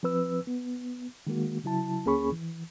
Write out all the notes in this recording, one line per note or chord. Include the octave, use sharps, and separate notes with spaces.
F3 C4 B4 E6
B3
D#3 G#3 A#3 F#4
C#3 F#3 E4 A5
D2 A#3 C#4 G#4 B5 C#6
E3